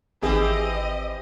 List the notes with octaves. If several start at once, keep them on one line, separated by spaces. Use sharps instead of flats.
G#1 E3 C4 G4 G#4 D#5